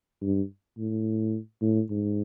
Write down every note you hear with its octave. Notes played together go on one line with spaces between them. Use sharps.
G2
A2
A2
G#2